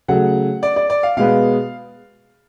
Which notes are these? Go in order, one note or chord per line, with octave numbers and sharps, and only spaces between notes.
C#3 F#3 A3 F#5
D5
D5
D5
F5
B2 G#3 B3 F5